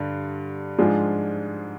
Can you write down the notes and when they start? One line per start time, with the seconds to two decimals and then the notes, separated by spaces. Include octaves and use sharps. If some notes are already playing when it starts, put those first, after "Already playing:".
Already playing: G2 D3
0.78 G#2 F3 G#3 D4 F4